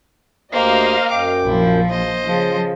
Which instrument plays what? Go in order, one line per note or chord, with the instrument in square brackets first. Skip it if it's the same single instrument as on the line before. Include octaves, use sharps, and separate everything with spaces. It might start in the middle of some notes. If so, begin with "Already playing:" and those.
[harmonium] D2 G4 [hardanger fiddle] A#3 C5 [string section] D#5 F5
[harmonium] F#2 G5 [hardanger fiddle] D6
[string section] A#1 F3 [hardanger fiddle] E4
[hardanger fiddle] C5 D#5
[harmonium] C#3 [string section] F3